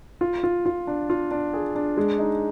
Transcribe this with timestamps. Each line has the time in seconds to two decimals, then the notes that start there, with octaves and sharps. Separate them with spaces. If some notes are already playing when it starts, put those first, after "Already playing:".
0.21 F4
0.43 F4
0.66 F4
0.87 D4
1.10 F4
1.31 D4
1.53 G#4
1.75 D4
1.97 G#3
2.19 D#4